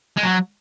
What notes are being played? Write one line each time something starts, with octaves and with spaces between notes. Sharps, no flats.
G#3
F#3